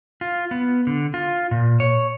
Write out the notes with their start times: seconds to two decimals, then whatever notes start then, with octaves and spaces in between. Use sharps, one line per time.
0.21 F4
0.51 B3
0.87 D3
1.14 F4
1.51 A#2
1.80 C#5